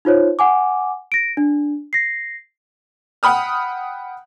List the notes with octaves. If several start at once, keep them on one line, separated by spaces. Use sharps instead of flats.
D#4 F4 C5 C#5
F#5 G#5 D6
A#6 D7
D4
A#6 C7
F#5 G5 B5 D#6 F6